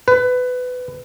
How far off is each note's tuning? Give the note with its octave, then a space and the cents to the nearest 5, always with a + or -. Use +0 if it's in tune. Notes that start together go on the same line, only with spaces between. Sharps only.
B4 +20